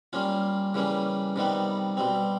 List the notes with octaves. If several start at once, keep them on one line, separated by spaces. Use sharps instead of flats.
G3 A#3 C#4 F4
C#3 E3 G3 A#3 C#4
C3 D#3 G3 B3
B2 G3 C4